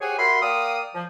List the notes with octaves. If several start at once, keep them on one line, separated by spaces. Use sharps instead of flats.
G4 G#4 C5 C#5 F#5 G#5
F#4 A#4 E5 B5 C6
A#3 D5 F5 G5 D#6
F3